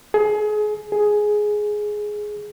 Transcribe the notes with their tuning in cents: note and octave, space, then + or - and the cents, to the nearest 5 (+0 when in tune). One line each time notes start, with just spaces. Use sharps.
G#4 +30
G#4 +10